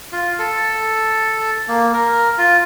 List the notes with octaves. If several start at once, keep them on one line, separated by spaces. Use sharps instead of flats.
F4
A4
A#3
A#4
F4